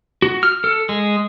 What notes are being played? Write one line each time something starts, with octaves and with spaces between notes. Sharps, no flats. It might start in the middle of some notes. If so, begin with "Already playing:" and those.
F#4
F6
A4
G#3